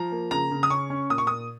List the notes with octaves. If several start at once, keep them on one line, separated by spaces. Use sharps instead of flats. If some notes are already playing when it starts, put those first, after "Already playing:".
Already playing: F3 A#5
A#3
C#3 A#5
C#3
D#6
C#4 C#6
C#4
A#2 D#6
C#6
A#2 D#6